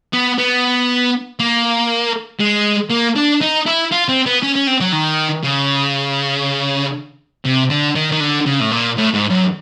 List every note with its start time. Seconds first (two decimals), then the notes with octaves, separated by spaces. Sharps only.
0.13 B3
0.38 B3
1.40 A#3
2.40 G#3
2.90 A#3
3.16 D4
3.42 D#4
3.67 E4
3.92 F4
4.09 C4
4.26 B3
4.43 C#4
4.55 C#4
4.67 C4
4.81 F#3
4.92 D#3
5.43 C#3
7.45 C3
7.70 D3
7.96 D#3
8.12 D#3
8.21 D3
8.47 C#3
8.61 A2
8.71 A#2
8.97 A2
9.14 G#2
9.30 F#2